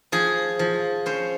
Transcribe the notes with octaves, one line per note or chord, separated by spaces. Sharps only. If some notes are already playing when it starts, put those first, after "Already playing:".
F3 G#4
F3
C#4 C5